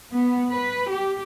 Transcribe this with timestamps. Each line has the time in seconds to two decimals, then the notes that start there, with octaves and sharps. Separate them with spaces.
0.13 B3
0.52 B4
0.91 G4